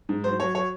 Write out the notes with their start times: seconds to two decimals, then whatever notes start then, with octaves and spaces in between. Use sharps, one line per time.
0.09 G#2
0.24 F#3 C5
0.40 F#3 C#5
0.55 F#3 C#5